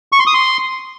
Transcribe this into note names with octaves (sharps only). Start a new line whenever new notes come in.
C#6
C6
D#6
C6